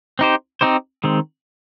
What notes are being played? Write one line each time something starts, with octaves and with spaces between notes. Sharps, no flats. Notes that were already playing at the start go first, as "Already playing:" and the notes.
C4 D#4 G4 C5
C4 D#4 G4 C5
D#3 G#3 C4